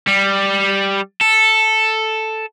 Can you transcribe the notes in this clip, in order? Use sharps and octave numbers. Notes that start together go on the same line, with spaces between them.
G3
A4